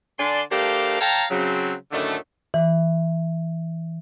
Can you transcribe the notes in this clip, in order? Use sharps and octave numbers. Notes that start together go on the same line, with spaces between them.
D3 D4 D5 G#5 C6
A3 D4 G4 A#4 C5 F5
C#5 F5 G5 A5 A#5
C#3 F#3 C4
F#2 A2 D3 D#3 A3
E3